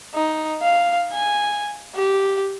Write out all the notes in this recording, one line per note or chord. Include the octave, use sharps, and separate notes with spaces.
D#4
F5
G#5
G4